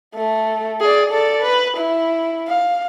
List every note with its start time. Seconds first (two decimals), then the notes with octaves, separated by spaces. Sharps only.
0.15 A3
0.81 G#4 D5
1.11 A4 D5
1.42 B4
1.78 E4
2.48 F5